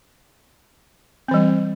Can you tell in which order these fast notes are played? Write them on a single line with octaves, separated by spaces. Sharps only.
C4 E3 G3